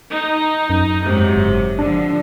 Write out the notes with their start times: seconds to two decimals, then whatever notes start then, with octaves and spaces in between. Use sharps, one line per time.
0.12 D#4
0.70 F#2
1.04 G#2 C3 F#3
1.36 F#1
1.79 D3 F3 D4